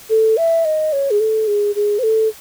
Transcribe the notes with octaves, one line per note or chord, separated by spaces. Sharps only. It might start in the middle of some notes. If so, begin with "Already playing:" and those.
A4
E5
D#5
C#5
G#4
A4
G#4
G#4
C5
A4